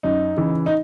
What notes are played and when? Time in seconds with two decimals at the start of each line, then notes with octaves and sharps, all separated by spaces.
0.03 F#2 D#4
0.37 C#3 E3
0.66 D#4